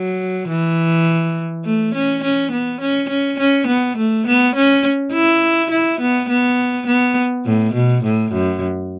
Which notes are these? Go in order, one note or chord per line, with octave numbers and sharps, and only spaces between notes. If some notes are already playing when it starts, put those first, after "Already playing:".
Already playing: F#3
E3
A3
C#4
C#4
B3
C#4
C#4
C#4
B3
A3
B3
C#4
E4
E4
B3
B3
B3
A2
B2
A2
F#2